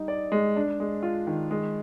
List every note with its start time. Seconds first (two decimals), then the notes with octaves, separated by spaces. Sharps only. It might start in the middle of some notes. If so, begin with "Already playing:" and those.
Already playing: G3 D#4
0.08 D5
0.32 G#3
0.56 D4
0.80 G#3
1.03 F4
1.27 D#3
1.51 G#3